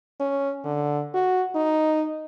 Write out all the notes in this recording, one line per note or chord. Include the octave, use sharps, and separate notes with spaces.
C#4
D3
F#4
D#4